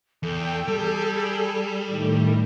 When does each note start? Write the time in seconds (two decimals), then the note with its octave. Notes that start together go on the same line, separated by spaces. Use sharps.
0.23 E2 A4 G5
0.68 G3 G#4
1.87 A2 D#3 A3